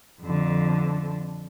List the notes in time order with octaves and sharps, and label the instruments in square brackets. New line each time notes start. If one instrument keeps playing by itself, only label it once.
[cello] F2 D3